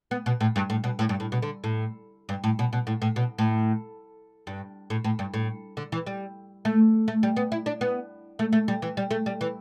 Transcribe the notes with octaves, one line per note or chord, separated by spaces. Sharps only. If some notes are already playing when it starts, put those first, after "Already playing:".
B3
B2
A2
G2
A2
B2
A2
G2
A2
B2
D3
A2
G2
A2
B2
B2
A2
A2
B2
A2
G2
A2
A2
G2
A2
D3
E3
G3
A3
A3
G3
B3
E4
D4
B3
A3
A3
G3
E3
G3
A3
G3
E3